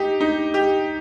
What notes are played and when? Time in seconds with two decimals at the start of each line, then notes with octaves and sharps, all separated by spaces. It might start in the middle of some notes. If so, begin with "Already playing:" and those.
Already playing: D#4 G4
0.21 D#4
0.54 G4